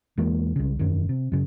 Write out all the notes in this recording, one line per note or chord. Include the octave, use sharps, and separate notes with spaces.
E2 E3 G#3 A#3
C2 C#3
E1 F#2 D#3
C3
F#2 C#3